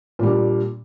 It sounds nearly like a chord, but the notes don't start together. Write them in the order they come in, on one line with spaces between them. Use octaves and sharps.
A#2 G3 D4